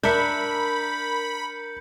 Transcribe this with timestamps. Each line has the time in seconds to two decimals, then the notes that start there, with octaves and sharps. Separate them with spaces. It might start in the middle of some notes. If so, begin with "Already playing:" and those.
0.03 D4 A#4 E5 B5 G6 C#7